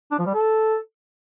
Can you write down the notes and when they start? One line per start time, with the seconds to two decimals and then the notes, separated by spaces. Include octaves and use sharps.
0.11 D4
0.19 F3
0.26 G3
0.34 A4